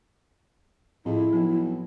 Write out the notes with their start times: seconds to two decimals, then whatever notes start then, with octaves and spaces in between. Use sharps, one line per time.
1.05 F2 A2 E4 G#4 D#5
1.33 B1 F3 C4